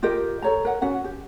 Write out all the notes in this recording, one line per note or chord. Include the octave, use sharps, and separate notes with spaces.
F4 G4 A#4 D#5
A4 C#5 A#5
A#4 F#5
C#4 F#4 F#5
G4